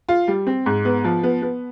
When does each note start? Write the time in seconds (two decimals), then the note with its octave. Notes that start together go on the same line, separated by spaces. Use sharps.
0.09 F4
0.28 G3
0.47 C4
0.66 G#2
0.85 B3
1.04 F3
1.23 B3
1.42 B3